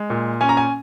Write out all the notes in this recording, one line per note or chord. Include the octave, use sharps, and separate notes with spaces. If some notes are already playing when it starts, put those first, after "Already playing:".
Already playing: G#3
A#2
C#4 G#5
A#5
G#5